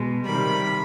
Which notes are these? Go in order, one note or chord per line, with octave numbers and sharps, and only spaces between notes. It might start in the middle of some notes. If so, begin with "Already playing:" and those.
Already playing: B2 G#3
C3 D#3 G3 B5